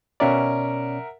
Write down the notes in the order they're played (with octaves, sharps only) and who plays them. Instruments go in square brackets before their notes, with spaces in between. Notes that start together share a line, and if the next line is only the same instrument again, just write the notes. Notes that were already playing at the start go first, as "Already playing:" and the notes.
[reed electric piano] B2 C#4 D5 [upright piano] A#4 E5 F#5